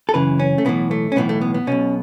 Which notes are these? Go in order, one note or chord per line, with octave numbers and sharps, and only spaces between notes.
A4
F#2 C#3 E3 B4
C#4
A3
B1 A2 E3 B3
A3
C#4
B1 A2 E3 B3
A3
B3
B3
B1 B2 C#4